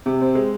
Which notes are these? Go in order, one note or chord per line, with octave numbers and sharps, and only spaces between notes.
C3
C4
G#3